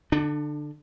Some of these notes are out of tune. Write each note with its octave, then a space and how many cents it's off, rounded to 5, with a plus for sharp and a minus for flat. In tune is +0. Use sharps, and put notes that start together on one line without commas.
D3 +0 D4 +30